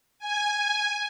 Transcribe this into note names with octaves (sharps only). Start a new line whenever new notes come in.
G#5